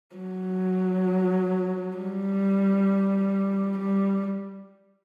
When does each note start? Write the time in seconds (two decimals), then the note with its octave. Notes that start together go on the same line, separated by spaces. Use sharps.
0.15 F#3
1.97 G3
3.78 G3